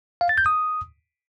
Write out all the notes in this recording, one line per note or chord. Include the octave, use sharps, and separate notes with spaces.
F5
A6
G6
D#6